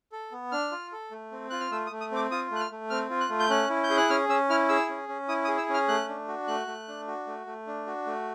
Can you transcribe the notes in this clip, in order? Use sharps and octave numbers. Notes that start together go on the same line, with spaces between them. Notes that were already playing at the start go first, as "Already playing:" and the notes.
A4
B3
D4 F6
F4
A4
A3
C4
F4 F#6
F6
A3 E6
D#6
A3
D#6
C4 D6
F4 D#6
A3 F#6
F6
A3
C4 F6
F4
F#6
A3
G6
C#4 F#6
E4
G6
G#4
F#6
C#4 F6
C#4 E6
E4 F6
G#4 E6
C#4
C#4
E4 D#6
D#6
G#4
E6
C#4 F6
A3 F#6
D4
F#4
A3 F#6
A3
D4
F#4
A3
A3
D4
F#4
A3